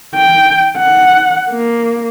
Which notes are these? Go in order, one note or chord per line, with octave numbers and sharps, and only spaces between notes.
G5
F#5
A#3